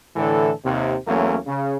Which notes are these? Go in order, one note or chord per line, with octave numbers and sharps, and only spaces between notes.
A2 D3 E3 A4
D#2 C3
E2 F#3 A3 A#3 C#4
C#3